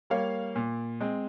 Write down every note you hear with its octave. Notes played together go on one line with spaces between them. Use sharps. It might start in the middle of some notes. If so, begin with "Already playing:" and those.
G3 A#3 C#5 F5
A#2
G#3 C4